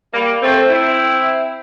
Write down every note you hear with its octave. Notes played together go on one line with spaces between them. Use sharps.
G3 A#3
A3 C4
C4 E4